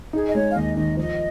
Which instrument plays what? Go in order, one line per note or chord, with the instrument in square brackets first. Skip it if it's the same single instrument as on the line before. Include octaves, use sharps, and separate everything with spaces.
[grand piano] D#4 [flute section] G#4
[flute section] D#5
[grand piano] G#3 [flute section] C#5
[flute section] F5
[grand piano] D#2 [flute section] D#5
[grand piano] D#3 [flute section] D#5
[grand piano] F3 [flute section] D#5